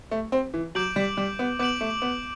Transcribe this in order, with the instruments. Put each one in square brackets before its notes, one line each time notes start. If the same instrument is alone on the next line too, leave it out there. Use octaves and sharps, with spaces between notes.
[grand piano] A3
C4
E3
[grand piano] F#3 [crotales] D6 G6 D7 F#7
[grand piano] G3
G3
B3
[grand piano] B3 [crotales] D6 G6 D7 F#7
[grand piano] A3
B3